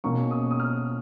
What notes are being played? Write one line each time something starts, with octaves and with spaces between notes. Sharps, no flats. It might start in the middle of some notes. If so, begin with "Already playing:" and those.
B2 A#3 C#4 C#6
D#6
D#6
F6